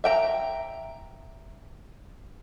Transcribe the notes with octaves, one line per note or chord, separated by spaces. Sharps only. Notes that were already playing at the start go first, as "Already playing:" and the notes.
E5 G5 A#5